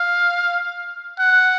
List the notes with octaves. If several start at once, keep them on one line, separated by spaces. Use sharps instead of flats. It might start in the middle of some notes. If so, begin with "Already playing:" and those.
Already playing: F5
F#5